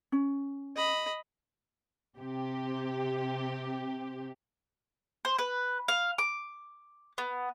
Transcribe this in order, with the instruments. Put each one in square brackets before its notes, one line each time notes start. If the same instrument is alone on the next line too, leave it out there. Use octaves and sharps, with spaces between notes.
[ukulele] C#4
[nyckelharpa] D#5 B5
[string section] C3 G4
[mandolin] C5
B4
F5
D6
B3